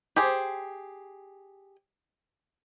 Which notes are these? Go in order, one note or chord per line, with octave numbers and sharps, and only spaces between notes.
G4 G#4 C5